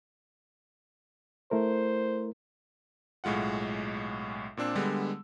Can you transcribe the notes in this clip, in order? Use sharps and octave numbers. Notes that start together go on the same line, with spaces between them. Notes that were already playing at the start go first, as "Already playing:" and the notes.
A3 E4 A#4 C5
B1 A2 G#3 F4 F#5
A#2 C4 D4 E6
D3 G3 G#3 B3